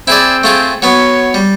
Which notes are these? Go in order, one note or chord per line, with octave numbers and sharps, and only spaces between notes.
C4 E4 G#4 D5
A3 F4 G#4
F#3 B3 C#5
G3